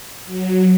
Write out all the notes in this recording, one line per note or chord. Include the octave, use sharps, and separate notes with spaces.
F#3